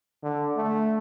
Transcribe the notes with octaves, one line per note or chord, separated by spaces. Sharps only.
D3
A3